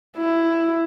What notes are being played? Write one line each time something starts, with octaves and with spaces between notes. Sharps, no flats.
E4